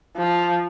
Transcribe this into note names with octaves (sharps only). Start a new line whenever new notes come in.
F3